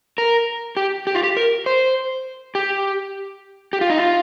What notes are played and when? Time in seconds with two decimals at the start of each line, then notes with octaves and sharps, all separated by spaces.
0.18 A#4
0.77 G4
1.07 G4
1.15 F4
1.23 G4
1.37 A#4
1.66 C5
2.55 G4
3.73 G4
3.81 F4
3.90 D#4
3.98 F4